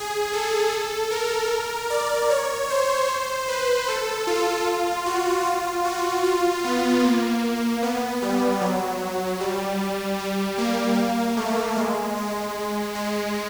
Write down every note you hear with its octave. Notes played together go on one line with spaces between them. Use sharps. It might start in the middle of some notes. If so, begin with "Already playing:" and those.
Already playing: G#4
A4
A#4
D5
C#5
C5
B4
A4
F4
F#4
F4
F#4
F4
B3
A#3
B3
G3
F#3
G3
G3
A#3
A3
G#3
G#3
G#3